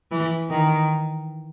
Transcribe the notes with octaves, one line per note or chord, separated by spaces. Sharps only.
E3
D#3